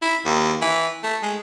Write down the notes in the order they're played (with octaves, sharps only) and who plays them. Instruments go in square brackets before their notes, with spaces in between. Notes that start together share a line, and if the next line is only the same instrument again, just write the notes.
[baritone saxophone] E4
D#2
E3
A3
G#3